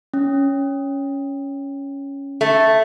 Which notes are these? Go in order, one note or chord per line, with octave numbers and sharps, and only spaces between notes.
C#4
A3